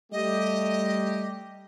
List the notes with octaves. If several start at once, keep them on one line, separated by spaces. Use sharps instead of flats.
G3 A3 G4 D#5